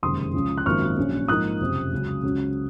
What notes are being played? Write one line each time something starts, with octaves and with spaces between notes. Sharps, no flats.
F#1 F2 C3 D#3 G#3 C6 D#6
C#2 C#3 F3
F#6
G#1 F#2 F3 A#3 D#4 C#6 F6
A#1 A#2 F#3 C#4
G#2 F3 A#3 D#4 D#6 F#6
F#1 F2 C3
C#2 C#3 F#3
C#2 C#3 F#3